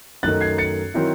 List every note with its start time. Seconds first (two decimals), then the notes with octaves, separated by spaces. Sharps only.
0.23 F#2 D#3 A3 D#4 F#6 A6
0.41 G#6 C7
0.58 A6 C#7
0.94 D#3 F#3 C4 E4